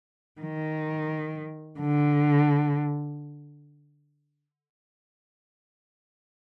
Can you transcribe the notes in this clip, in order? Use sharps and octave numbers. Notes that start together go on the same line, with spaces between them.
D#3
D3